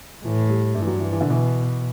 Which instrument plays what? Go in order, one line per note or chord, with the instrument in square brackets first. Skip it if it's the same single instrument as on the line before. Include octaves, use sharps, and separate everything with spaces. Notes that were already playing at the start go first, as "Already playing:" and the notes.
[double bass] A2 [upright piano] E3
[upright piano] G3
[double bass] G2 [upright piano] A3
[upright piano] E3
F#3
E3
E3
D3
[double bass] B2
[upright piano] E3